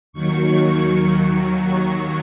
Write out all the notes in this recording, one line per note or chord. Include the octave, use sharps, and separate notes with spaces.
D#2 D#3 F#3 C#6